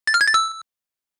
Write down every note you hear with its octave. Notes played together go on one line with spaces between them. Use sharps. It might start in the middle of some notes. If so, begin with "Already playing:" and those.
A6
F6
G#6
A6
E6